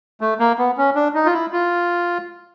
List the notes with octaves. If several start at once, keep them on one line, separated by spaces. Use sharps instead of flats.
A3
A#3
B3
C#4
D4
D#4
F4
E4
F4